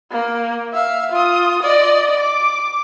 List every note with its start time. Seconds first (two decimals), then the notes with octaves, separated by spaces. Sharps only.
0.11 A#3
0.73 E5 F5
1.12 F4 D#6
1.63 D5 D#5
2.19 D6